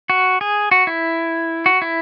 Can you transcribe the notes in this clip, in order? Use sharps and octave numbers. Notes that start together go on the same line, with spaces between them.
F#4
G#4
F#4
E4
F#4
E4